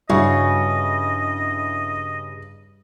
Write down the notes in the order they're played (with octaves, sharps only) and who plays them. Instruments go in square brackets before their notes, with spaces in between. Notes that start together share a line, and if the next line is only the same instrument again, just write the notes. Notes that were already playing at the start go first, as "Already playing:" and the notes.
[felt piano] G2 [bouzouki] C#3 [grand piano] E4 F#4 C#6 [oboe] D#5